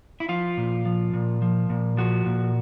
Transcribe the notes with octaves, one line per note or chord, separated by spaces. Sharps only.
E4
F3 F4
A#2
F3
A#2
F3
A#2
F3 F#4
A#2